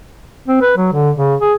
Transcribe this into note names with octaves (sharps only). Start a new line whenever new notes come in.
C4
B4
F#3
D3
C#3
G#4